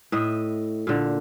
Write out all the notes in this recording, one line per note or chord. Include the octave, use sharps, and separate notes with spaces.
A2 D#5 E5
A#2 D3